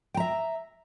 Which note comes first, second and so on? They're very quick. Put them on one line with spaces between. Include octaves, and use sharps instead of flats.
G5 A#5 E5